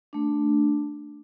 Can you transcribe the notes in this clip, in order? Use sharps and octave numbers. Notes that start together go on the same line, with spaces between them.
A3 D4